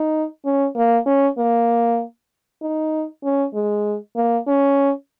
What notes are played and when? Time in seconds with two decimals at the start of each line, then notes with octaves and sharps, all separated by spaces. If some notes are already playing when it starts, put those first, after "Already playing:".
Already playing: D#4
0.45 C#4
0.76 A#3
1.06 C#4
1.38 A#3
2.62 D#4
3.23 C#4
3.54 G#3
4.16 A#3
4.47 C#4